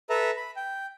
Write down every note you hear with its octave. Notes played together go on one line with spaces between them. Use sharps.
A4 B4 E5 A#5
B5
G5